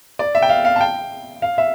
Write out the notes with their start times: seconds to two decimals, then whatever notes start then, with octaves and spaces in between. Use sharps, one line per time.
0.19 D5
0.35 E5
0.42 G5
0.49 F5
0.65 F5
0.76 A5
0.81 G5
1.42 F5
1.58 E5